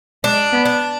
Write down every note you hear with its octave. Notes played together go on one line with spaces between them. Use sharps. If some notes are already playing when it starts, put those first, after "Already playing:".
G#3 D4
B3
D4